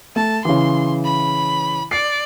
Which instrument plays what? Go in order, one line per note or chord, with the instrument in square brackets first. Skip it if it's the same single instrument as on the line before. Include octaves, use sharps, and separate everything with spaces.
[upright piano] A3 [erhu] A5
[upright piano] C#3 E3 [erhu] C6
[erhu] B5
[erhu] D5 [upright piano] C7